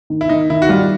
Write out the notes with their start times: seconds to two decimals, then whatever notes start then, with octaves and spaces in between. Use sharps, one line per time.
0.10 D#3
0.21 E4
0.29 D#3 D#4
0.50 D#3 E4
0.62 F#4
0.69 G3 F4